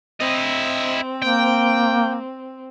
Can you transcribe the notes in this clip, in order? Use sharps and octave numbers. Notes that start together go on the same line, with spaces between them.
C4 E4 D#5
A#3 G5